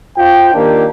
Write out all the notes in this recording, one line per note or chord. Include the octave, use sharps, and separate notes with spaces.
F4 C5 G5
D#3 A#3 D4 G4